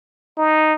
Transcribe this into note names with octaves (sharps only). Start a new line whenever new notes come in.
D#4